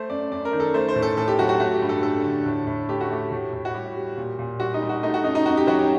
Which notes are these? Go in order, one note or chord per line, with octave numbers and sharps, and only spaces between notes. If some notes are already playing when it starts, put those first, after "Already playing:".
Already playing: A3 C5
F#2 D5
F#2 D5
A#4
D#3
A4
A3 C5
C5
A2
A4
A2 A4
G4
F#3 F#4
F#4
A3 F#4
G4
G2
A4
G2 A4
D3
A2
A2
A3 G4
F#4
A3 G4
A2
A2
F#4
G3 G4
G3
A#2
A#2
G3 F#4
D#4
G3
F#4
A3 D#4
F#4
F#2 D#4
D#4
F#2 F#4
G4
F#3 F#4
G4